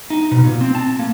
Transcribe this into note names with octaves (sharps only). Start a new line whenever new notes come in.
D#4
B2
A#2
C4
A5
A#3